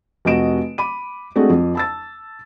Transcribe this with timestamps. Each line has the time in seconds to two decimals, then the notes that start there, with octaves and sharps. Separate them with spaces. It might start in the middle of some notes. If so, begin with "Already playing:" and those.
0.25 F1 C3 F#4 D#5 D7 E7
0.78 B5 D6 D#7
1.36 G#3 A3 C4 D4 F#4 G#4
1.50 F2
1.75 A5 E6 A6